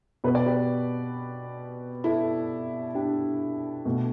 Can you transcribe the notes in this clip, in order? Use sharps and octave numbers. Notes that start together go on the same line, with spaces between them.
B2 B3 B4
D5
G4 B4
E4 A4
D4 G4
B2 A3